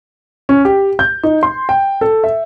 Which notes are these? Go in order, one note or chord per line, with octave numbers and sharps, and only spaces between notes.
C#4
G4
G6
D#4
C6
G5
A4
E5